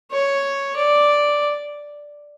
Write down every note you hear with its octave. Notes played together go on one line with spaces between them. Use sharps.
C#5
D5